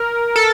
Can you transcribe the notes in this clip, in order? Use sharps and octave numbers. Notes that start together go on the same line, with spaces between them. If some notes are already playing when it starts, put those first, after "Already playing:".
Already playing: A#4
A4